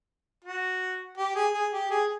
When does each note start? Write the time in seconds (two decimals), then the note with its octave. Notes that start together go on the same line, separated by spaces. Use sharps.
0.44 F#4
1.18 G4
1.35 G#4
1.54 G#4
1.73 G4
1.91 G#4